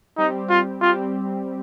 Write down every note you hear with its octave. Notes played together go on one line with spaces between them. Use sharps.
G3 C4 D#4 G4
F4
G3 C4 F4 G4